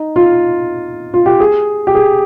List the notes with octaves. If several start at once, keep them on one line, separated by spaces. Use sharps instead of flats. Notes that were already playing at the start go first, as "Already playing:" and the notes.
Already playing: D#4
F4
F4
G4
G#4
G4
G#4